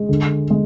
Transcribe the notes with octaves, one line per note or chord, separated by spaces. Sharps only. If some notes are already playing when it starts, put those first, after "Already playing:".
Already playing: G#3
D3
G#3